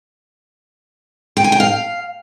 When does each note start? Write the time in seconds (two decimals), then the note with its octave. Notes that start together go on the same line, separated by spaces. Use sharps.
1.37 G5
1.44 G#5
1.52 G5
1.60 F5